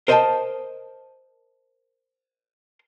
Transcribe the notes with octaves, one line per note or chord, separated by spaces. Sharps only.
A#4 C5 D#5 E5 G5 A5